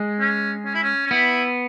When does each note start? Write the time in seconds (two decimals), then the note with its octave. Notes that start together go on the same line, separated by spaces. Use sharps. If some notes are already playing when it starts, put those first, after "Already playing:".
Already playing: G#3
0.20 C#4
0.65 C#4
0.75 E4
0.83 C#4
1.07 C#4
1.11 B3 E4